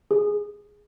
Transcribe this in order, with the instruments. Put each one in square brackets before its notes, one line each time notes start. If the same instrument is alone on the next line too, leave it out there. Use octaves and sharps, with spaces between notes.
[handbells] G#4